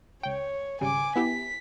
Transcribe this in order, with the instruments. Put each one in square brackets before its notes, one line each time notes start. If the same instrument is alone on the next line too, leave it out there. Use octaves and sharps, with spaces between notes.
[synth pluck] C#2 G5 [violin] C#5
[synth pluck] G#1 C#3 G3 [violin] G#5 D6
[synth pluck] B3 E4 G4 [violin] B6